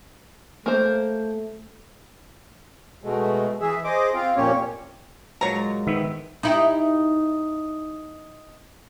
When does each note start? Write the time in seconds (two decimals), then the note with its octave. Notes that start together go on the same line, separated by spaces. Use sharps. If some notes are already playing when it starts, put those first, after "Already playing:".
0.66 A3 A#3 C5
3.04 B2 G#3 A3
3.61 E3 G#4 E5
3.84 G#4 C5 D#5 D6
4.14 C4 F4 F5
4.36 F2 A#2 A#3 C#4 G4 C#5
5.41 A#2 F#3 G#3 C#5 A#5
5.87 G#2 D#3 B3 E5
6.43 D#4 E4 G4